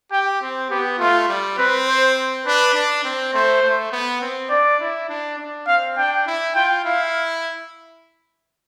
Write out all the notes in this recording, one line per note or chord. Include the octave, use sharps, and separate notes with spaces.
G4 G5
C4
B3 G4
A3 F4
G3
C4 B4
C5
D4 B4
D4
C4
A3 C5
A3
B3
C4
D4 D5
E4
D4
D4
C4 F5
D4 G5
E4
F4 G5
E4 F5